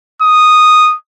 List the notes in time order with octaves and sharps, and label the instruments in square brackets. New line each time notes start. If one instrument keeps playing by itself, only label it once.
[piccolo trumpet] D#6